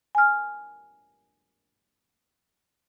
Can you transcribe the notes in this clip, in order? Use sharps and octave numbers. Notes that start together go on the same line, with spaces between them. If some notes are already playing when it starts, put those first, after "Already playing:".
G#5 F6